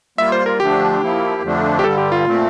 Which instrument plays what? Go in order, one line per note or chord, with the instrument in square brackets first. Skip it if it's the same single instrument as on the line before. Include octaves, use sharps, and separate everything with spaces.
[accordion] G3 A#3 F4 [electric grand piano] E5
[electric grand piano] C5
A#4
[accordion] D3 F3 A3 D4 [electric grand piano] G4
[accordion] F3 A#3 E4
F2 D3 F3 A3 D4
[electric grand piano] G4
[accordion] G2 D3 G3 [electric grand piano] A4
[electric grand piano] G4
F4
[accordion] A#2 A3 C4